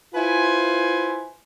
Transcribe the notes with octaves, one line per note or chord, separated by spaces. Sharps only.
E4 F4 B4 C5 G#5